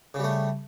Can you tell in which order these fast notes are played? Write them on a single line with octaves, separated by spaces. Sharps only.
C#3 G3 A3